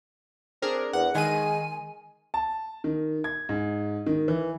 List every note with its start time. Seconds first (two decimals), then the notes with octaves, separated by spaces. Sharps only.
0.62 C4 D4 G#4 A#4
0.93 E2 F#5
1.15 D#3 G#3 G#5 D#7
2.34 A5
2.84 D#3
3.24 G#6
3.49 G#2
4.07 D#3
4.28 E3